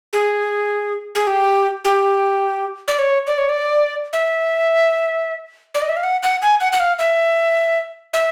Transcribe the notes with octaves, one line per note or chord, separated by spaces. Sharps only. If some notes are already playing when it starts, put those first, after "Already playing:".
G#4
G#4
G4
G4
D5
C#5
D5
C#5
D5
E5
D5
D#5
E5
F5
F#5
F#5
G#5
F#5
F#5
F5
E5
E5